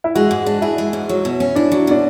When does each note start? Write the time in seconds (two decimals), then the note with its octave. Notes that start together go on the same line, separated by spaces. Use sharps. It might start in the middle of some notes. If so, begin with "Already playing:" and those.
0.04 E4
0.15 G#3 F#4
0.31 G#2
0.46 D4
0.62 E4 G#4
0.78 G#3
0.93 G#2
1.09 F#3
1.25 B2
1.40 C#4
1.56 D4 E4
1.72 F#3
1.87 B2 D4